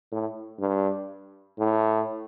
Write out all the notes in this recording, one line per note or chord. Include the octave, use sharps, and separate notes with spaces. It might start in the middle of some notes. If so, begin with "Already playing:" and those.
A2
G2
A2